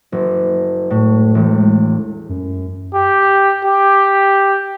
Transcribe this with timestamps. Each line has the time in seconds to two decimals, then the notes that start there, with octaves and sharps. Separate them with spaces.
0.12 F#1
0.91 A2
1.35 E1
2.29 F#2
2.94 G4
3.65 G4